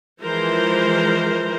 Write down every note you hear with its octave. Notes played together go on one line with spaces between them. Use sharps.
E3 F3 G#3 A#4 C5